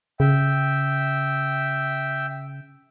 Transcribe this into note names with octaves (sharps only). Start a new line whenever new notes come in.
C#3 E5 G5